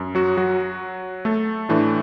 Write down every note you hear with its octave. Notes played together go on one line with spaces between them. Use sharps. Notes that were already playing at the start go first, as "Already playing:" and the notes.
Already playing: F#2
F#3 F#4
F#3 F#4
A3 A4
A2 E3 A3 D4